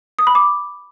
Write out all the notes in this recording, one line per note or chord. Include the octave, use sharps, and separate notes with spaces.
D#6
B5
D6